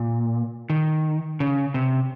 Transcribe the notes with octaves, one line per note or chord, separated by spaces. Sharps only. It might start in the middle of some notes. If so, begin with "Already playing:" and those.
Already playing: A#2
D#3
C#3
C3